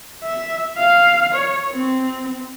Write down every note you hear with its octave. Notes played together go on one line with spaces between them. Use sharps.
E5
F5
C#5
C4